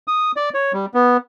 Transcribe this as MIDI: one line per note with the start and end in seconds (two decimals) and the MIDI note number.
0.08 0.32 87
0.36 0.49 74
0.54 0.72 73
0.73 0.86 55
0.94 1.17 59